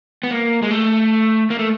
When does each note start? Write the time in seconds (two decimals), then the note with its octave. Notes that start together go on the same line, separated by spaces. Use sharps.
0.23 B3
0.31 A#3
0.62 G#3
0.71 A3
1.50 A#3
1.59 A3